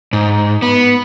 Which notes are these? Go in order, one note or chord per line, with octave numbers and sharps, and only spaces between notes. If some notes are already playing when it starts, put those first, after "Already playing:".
G#2
B3